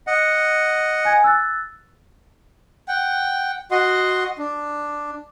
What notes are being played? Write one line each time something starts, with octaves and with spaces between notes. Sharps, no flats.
D#5 F#5
G#5 G#6
E6 F#6 A6
F#5 G5
F#4 D#5 F#5 C6
D4